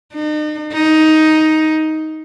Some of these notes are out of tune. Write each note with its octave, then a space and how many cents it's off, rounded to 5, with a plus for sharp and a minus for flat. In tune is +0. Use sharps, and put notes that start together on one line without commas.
D#4 -40
D#4 +10